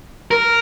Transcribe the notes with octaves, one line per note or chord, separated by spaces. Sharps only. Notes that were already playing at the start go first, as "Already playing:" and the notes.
A#4